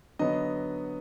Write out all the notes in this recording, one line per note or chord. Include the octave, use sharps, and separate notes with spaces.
D3 F#3 B3 D#5